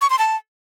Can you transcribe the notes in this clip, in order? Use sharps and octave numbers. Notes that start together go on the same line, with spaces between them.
C#6
C6
A5